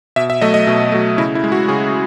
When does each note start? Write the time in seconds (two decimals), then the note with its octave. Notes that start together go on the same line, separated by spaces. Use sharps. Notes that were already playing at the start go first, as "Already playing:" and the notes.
0.16 B2 E5
0.30 E5
0.41 F#3 A3 D#5
0.54 D#5
0.67 B2
0.92 F#3 A3
1.18 C#3 E4
1.35 E4
1.44 G#3
1.52 F#4
1.68 C#3 G#4